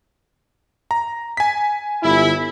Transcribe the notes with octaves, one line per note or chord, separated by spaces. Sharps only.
A#5
G#5 B6
G1 E4